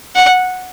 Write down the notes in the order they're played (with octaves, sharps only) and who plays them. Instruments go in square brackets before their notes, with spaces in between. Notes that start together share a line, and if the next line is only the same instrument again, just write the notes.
[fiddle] F#5